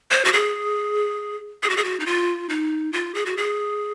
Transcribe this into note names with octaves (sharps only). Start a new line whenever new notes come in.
C5
F#4
G#4
G#4
F#4
G#4
F#4
D#4
F4
D#4
F4
G#4
F#4
G#4